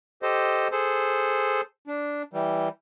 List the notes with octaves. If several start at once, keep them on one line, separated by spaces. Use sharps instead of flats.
G4 A4 C5 D#5
G#4 A4 C5
D4
E3 G3